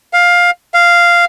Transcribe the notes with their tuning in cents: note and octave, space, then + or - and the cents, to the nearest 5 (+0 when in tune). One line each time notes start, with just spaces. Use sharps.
F5 +15
F5 -5